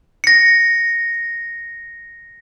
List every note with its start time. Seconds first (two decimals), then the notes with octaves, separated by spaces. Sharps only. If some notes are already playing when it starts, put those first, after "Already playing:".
0.24 A#6 C#7